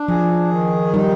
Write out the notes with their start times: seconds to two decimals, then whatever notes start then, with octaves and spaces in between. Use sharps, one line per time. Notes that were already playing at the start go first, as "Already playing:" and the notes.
Already playing: D4
0.08 F3 G#4
0.51 D#3
0.94 G3 D#4